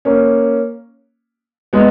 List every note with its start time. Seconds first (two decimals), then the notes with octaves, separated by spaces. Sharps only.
0.05 A#3 C#4
1.73 G#3 B3